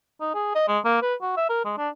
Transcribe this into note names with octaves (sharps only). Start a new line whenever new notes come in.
D#4
G#4
D#5
G#3
A#3
B4
F#4
E5
A#4
G#3
D4